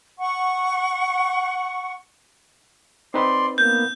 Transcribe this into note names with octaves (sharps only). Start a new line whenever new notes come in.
F#5 C#6
C4 D#4 B4 D5 C6
A#3 B3 G6